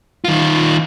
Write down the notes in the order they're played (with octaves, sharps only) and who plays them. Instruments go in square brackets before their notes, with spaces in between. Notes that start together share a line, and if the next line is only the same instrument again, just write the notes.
[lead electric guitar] D#3 F4